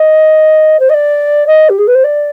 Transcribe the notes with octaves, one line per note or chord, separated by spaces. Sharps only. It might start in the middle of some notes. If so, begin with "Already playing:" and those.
Already playing: D#5
C5
D#5
D5
D#5
G4
G#4
B4
C5
D5